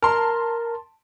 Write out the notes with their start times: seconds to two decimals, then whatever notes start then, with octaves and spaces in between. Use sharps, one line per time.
0.02 A#4 A5 C6